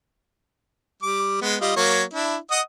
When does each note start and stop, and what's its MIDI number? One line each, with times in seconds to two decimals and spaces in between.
1.02 1.38 55
1.02 1.38 86
1.41 1.56 56
1.41 1.56 59
1.61 1.72 55
1.61 1.72 65
1.61 1.72 75
1.76 2.03 54
1.76 2.03 58
1.76 2.03 73
2.13 2.36 62
2.13 2.36 64
2.51 2.60 75
2.51 2.60 78
2.51 2.60 87